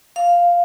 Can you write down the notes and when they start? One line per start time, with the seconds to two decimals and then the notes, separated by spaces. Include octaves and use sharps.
0.16 F5